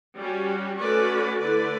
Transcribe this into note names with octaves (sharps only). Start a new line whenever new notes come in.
G3 C#4 F#4
A3 C#4 F#4 B4 D5
D3 A3 E4 B4 D5